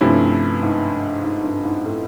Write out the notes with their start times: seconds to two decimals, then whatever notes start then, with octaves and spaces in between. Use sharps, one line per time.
0.01 G2 C3 F3 A3 C#4 E4
0.63 G#2
1.23 G#2
1.44 G2
1.65 G#2
1.85 A2